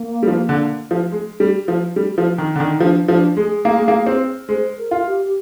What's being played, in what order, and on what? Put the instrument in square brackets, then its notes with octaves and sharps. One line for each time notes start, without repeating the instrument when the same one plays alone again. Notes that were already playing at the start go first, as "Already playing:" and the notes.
Already playing: [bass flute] A#3
[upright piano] G3
F3
D3
F3
G#3
G3
F3
G3
F3
D#3
D3
D#3
[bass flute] D#4
[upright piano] F3 [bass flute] D4
[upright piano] F3 [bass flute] D4
[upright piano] G#3 [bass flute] G#4
[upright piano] A#3
G#3
A#3
C4
[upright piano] G#3 [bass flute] C5
[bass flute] A#4
[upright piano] F4
[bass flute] G4
G4